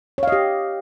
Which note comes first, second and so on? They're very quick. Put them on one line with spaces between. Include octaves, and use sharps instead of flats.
C#5 F5 D#5 G4